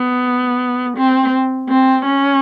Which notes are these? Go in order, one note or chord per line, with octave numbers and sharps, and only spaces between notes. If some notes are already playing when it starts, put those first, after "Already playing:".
Already playing: B3
C4
C4
C#4